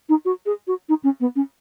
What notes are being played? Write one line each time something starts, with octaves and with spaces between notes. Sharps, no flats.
D#4
F#4
G#4
F#4
D#4
C#4
B3
C#4